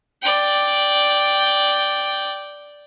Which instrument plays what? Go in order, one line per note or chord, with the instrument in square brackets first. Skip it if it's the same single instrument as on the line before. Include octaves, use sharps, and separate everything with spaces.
[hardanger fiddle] D5 G5